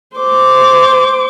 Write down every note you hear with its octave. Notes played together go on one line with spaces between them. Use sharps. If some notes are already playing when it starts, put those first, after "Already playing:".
C5 D6